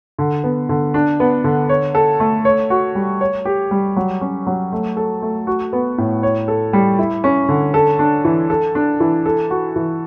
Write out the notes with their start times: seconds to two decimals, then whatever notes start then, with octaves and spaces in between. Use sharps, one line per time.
0.18 D3
0.44 B3
0.69 D3
0.94 D4
1.20 B3
1.44 D3
1.69 C#5
1.95 A4
2.20 A3
2.45 C#5
2.70 F#4
2.95 G3
3.21 C#5
3.45 G4
3.71 G3
3.96 F#3
4.21 C#4
4.47 F#3
4.72 A3
4.97 A4
5.22 A3
5.47 F#4
5.73 B3
5.98 A2
6.23 C#5
6.48 A4
6.73 G3
6.99 E4
7.24 C#4
7.49 D3
7.74 A4
7.99 D4
8.25 E3
8.50 A4
8.75 D4
9.00 E3
9.25 A4
9.50 F#4
9.76 E3